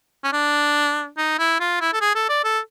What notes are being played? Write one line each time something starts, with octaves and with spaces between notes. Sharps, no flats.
C#4
D4
D#4
E4
F4
E4
A4
G#4
A4
D5
A4